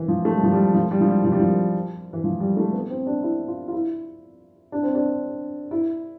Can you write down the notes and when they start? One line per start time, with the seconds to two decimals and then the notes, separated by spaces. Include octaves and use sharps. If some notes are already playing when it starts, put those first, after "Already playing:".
Already playing: E3
0.08 F3
0.25 A3
0.34 G3
0.43 F3
0.52 G3
0.74 F3
0.91 G3
1.01 F3
1.08 G3
1.24 F3
1.32 G3
1.39 F3
2.13 E3
2.24 F3
2.40 G3
2.57 A3
2.73 B3
2.90 C4
3.07 D4
3.23 E4
3.48 F4
3.68 F4
3.73 E4
4.72 D4
4.83 C4
4.95 D4
5.71 E4